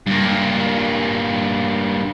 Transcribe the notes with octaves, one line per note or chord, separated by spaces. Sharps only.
G2 A#3